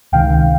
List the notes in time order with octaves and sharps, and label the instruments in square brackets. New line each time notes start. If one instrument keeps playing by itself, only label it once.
[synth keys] C#2 C3 D#3 F5 G5